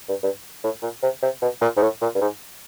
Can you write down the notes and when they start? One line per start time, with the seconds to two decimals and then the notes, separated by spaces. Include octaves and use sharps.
0.09 G2
0.23 G2
0.63 A2
0.82 A#2
1.03 C3
1.22 C3
1.42 B2
1.61 A#2
1.76 G#2
1.82 A2
2.01 A#2
2.15 G2
2.21 G#2